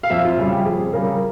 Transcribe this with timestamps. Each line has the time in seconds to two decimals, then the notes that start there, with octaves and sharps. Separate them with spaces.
0.03 F5
0.10 F2 E5
0.25 F4
0.37 C#3 G3
0.52 G4
0.65 F2 G#4
0.93 C#3 G3 A#4